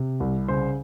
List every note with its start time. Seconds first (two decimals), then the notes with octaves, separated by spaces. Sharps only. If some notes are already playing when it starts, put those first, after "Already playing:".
Already playing: C3
0.20 C2
0.48 C#3 C5